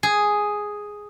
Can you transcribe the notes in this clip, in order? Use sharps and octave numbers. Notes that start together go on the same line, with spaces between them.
G#4